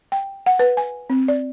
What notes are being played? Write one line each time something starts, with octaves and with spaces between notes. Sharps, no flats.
G5
F#5
B4
G#5
C4
D5